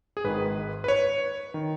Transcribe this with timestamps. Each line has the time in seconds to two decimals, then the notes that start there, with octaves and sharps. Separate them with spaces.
0.17 G#4
0.24 G#1 G#2 D#3 B4
0.84 B4
0.88 C#5
1.54 D#3